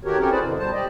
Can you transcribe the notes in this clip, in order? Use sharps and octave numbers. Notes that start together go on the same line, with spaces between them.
D#3 A3 F#4 G4 A#4 C#5
C4 C#4 F#4 G4 A4 A#4
E4 G#4 B4 C5 D5
F#2 B2 D3
B2 G3 C5 A5
G4 D5 D#5